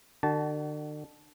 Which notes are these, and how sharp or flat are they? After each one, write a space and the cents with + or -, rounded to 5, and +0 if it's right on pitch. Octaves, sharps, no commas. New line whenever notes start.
D3 +40 F#4 +40 A5 -15